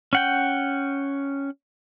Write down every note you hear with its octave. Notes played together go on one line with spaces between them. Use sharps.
C#4 F#5 G5